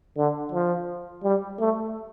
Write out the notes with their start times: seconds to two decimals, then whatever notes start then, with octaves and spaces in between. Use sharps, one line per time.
0.17 D3
0.52 F3
1.24 G3
1.59 A3